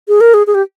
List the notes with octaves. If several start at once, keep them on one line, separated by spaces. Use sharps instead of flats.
G#4
A#4
G#4
G#4
G4